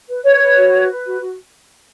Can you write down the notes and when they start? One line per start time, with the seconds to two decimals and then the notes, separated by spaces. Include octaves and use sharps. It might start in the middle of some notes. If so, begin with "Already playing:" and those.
0.08 B4
0.24 B4 C#5
0.41 B4
0.57 F#4
0.73 B4
0.89 B4
1.05 F#4
1.21 F#4